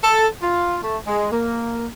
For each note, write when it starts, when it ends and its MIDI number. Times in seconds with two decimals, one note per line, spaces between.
0.03 0.27 69
0.42 0.77 65
0.82 0.97 57
1.05 1.28 56
1.31 1.88 58